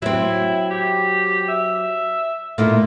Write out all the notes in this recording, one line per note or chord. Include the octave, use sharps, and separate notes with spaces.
F#3 C4 E4
G4
E5
A#2 A3 E4 F4